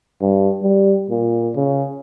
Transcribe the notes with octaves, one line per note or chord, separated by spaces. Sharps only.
G2
G3
A#2
C#3